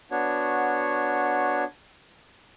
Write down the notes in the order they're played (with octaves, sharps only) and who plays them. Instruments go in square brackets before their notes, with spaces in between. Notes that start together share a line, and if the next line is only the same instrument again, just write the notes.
[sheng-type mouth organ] B3 D4 F#4 C#5